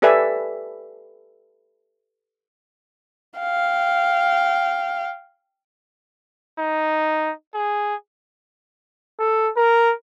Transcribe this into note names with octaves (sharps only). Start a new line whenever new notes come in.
G4 A4 B4 D5 E5 G#5
F5 G5
D#4
G#4
A4
A#4